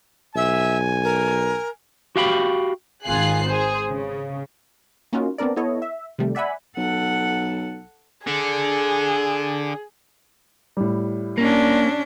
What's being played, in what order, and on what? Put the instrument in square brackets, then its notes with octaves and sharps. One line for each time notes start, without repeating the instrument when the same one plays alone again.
[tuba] B1 [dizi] E5 [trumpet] G#5
[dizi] A#4
[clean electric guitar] F#4 G4 F5 G5 A5 B5
[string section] G#1 D#3 F4 G#4 F#6 C7
G#4 C5
C#3
[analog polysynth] A#3 C#4 D#4 F4 F#4
B3 C4 D4 A#4 D5
B3 E4 A4 C#5 D#5
E5
C3 D#3 G3 A3
D5 E5 F#5 G#5 B5
[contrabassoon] B1 [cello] A4 F#5
[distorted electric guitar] D3 [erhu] G#4
[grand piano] A2 G3
[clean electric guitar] A#3 [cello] C#4 D4